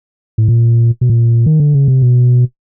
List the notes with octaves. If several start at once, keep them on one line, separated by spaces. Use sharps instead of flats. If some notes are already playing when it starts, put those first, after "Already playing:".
A2
A#2
B2
A#2
D#3
D3
C#3
C3
B2